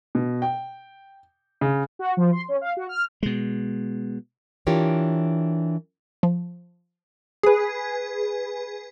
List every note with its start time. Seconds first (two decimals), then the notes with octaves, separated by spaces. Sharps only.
0.15 B2
0.42 G5
1.61 C#3
1.99 F#4
2.17 F3
2.32 C6
2.48 C#4
2.61 F5
2.77 F#4
2.89 F6
3.23 B2 G#3
4.67 E3 D4 F4 G4 A#4 C#5
6.23 F3
7.43 G#4 B4